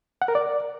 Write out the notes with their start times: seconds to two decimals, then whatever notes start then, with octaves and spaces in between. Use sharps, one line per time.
0.22 F#5
0.28 A#4
0.35 D5